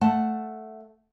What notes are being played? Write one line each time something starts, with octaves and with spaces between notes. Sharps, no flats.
A3 F#5 A5